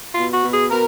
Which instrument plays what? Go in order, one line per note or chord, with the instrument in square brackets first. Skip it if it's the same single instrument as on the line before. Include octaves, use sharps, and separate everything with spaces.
[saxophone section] F4
B2
F#4
B2
G#4
B2 A#4